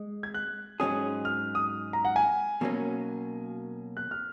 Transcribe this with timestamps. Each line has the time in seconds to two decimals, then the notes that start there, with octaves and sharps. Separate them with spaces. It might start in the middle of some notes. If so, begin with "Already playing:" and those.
Already playing: G#3
0.23 G#6
0.34 F#6
0.80 G#2 F#3 C#4 G#4 D#6
1.25 F6
1.55 D#6
1.93 A#5
2.05 F#5
2.16 G#5
2.61 B2 F#3 A#3 C#4
3.97 F#6
4.11 F6